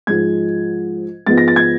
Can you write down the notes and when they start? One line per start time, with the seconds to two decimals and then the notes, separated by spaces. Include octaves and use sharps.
0.07 G#2 F3 G#3 G#6
1.26 G#2 F3 G#3 B3 A6
1.38 A#6
1.48 A6
1.56 G#6